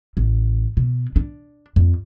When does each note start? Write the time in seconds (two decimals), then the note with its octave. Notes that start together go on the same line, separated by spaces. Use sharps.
0.17 A1
0.77 B2
1.16 D4
1.76 F2